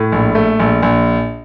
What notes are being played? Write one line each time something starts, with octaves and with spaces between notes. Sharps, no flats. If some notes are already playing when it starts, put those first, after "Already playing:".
Already playing: A2
A#1
A3
A#1
A#1